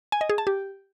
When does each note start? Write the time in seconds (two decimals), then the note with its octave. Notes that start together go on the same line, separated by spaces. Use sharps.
0.12 G#5
0.21 D#5
0.30 G#4
0.38 A5
0.47 G4